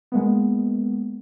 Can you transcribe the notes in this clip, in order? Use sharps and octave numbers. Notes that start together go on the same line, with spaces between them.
G#3 A#3 B3